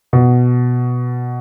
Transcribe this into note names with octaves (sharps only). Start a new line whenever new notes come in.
B2